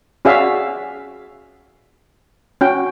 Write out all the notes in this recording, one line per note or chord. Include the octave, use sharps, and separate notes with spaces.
C#4 F#4 G#4 D5 E5 F5
C#4 F#4 G5